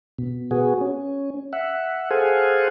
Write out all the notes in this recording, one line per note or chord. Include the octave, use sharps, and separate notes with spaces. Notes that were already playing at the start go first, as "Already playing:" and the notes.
B2
B3 F#4 G#4
C#4
E5 F#5
G#4 A4 C5 F5 F#5 G#5